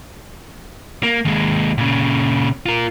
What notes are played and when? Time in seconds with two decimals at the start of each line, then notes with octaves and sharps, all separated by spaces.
1.03 A#3
1.25 D#2 G#3
1.78 A#2 C#3
2.66 F4 A#4